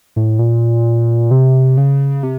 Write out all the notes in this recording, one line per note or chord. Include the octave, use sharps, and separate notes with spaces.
A2
A#2
C3
C#3
C3